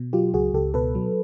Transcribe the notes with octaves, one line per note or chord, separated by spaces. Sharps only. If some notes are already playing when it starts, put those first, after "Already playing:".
Already playing: B2
F#3 F4 G4
C#2 F#4 G#4
C#2 G4 A4
B2 A4 B4
F#3